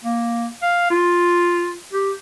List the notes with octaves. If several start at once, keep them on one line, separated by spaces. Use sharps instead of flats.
A#3
F5
F4
G4